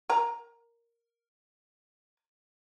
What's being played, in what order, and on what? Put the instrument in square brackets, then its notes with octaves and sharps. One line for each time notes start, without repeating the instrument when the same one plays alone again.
[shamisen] A#4 A#5